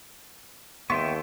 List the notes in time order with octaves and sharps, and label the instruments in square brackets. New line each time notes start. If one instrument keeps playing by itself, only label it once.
[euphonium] D#2 [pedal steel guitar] B3 E5 G5 [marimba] C6 [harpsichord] C#6